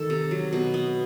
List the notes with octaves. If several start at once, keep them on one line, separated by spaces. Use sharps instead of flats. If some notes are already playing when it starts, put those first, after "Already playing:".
Already playing: D#3 A4
C3
F#3
B2
B3